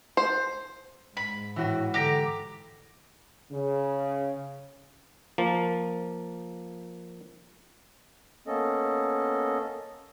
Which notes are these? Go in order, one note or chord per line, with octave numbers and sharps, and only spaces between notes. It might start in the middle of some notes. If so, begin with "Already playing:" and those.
C5
G#2 B5
A2 E3 F#4
D3 G4 A#5
C#3
F3 A#3
A#3 B3 C#4 A4 D#5